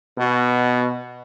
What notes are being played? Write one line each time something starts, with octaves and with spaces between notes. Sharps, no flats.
B2